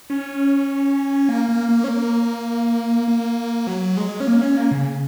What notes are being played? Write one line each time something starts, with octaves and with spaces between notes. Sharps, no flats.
C#4
A#3
A#3
A#3
C#4
A#3
A#3
F#3
G#3
C#4
A#3
C#4
A#3
C#3